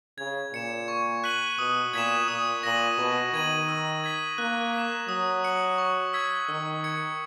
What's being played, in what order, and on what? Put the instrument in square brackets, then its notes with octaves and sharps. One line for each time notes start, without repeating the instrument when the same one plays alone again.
[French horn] C#3 [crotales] G#6
[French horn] A#2 [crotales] C#7 E7
[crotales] C#6
F#6 B6 D#7 F#7
[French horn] B2 [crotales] D#6
[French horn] A#2 [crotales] G#6 B6 E7
[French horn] A#2 [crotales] D#6
[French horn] A#2 [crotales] A#6 D#7 F#7
[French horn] B2 [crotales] C#6
[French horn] D#3 [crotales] G#6 D#7 F#7
[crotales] E6
G#6 B6
[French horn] A#3 [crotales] F#6
[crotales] B6 E7
[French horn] F#3 [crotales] D#6
[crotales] F#6 C#7 F#7
C#6
E6 G#6 B6
[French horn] D#3 [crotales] E6
[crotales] G#6 C#7